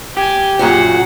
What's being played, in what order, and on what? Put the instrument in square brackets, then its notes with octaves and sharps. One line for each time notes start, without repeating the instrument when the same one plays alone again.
[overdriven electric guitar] G4 [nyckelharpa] G#5
[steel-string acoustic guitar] F#2 A#2 F#4 [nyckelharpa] G#4 F#5